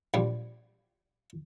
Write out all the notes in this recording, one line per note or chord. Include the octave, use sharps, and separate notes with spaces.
A#1 G3